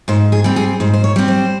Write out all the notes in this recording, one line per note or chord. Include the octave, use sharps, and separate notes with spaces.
G#2 C5
G#4
G3 C4
G#4
G#2 C5
C5
C#5
G3 C4
C5